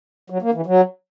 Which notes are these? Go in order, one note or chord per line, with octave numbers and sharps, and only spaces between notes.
F#3
A#3
E3
F#3